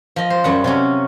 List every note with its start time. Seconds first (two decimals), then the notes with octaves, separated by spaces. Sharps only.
0.16 F3 D#5
0.30 C5
0.44 F#2 G3 F#5
0.64 C3 F#3 C#4